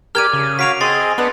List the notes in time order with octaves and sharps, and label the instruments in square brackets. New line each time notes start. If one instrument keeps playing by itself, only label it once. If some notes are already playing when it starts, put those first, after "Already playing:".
[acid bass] G4 [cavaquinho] A#4 D5 [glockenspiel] F6 G#6 D#7
[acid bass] C#3
[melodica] F#4 C#5 F5 [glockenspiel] B6 D7 F7
[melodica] C4 C5 D#5 [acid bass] G#4 [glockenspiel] C6 A6 C7
[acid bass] B3 [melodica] D4 F#5 [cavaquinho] B4 D#5